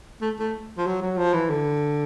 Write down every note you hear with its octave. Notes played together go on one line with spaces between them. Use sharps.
A3
A3
F3
F#3
F#3
F3
E3
D3